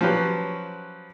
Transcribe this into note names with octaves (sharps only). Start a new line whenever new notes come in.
F3 F#3 C#4 G4 B4